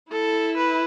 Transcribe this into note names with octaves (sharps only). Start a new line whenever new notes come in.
E4 A4
B4